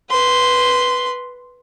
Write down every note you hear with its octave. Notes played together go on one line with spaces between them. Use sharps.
B4 C6